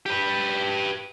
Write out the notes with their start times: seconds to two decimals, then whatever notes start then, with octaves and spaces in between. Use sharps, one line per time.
0.06 G4 B4